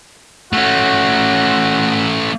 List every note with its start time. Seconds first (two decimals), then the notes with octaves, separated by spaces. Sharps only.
0.53 A3 C#4 F#4